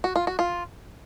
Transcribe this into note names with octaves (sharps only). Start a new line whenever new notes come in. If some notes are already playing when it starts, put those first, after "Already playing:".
F#4
F4
F#4
F4